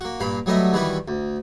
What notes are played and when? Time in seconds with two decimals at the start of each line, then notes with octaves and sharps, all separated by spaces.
0.01 A#3 F#4
0.20 G2 A#2 F5 B5
0.46 F#3 G3 A3 B3 D#5 E5
0.73 D#3 E3 G3 E4 F#4 B4
1.08 D2